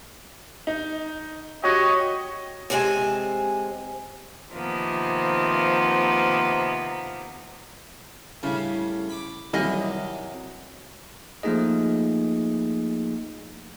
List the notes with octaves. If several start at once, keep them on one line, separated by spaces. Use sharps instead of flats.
D#4
F#4 G4 C#5 D#5
C3 G#3 C4 D#5 G#5 A5
C3 D#3 F3 A#3 B3
A2 C#3 G3
B5 D6
C3 D#3 E3 F#3 G3 E4 D#5
F3 A3 A#3 D#4 G#4 D#5